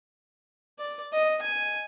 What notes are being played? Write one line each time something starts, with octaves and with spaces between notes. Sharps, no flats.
D5
D#5
G#5